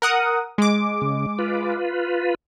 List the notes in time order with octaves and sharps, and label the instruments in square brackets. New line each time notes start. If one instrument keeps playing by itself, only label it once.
[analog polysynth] A#4 F#5 D#6
G#3 D6
[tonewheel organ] C#3
F4 B4